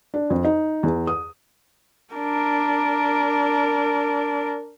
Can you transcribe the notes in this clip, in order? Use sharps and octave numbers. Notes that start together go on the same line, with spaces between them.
D4
F2
D#4
E2
D#6
D4 A#4